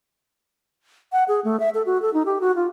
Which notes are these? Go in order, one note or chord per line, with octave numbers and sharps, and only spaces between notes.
F#5
G#4
A3
E5
A4
F#4
A4
D#4
G4
F#4
F4